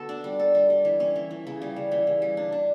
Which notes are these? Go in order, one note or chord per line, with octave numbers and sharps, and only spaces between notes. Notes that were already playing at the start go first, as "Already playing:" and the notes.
Already playing: D3 B3 F#4 A4
D4
G3
A4
G3
G3
E3
C#4
E3
E3
C#3
G3
C#3
E3
C#3
G3
D4
D4